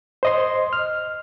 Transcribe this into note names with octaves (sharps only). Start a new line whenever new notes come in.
C5 D#5 C6
F6